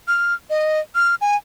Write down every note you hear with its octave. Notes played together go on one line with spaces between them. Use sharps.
F6
D#5
F6
G#5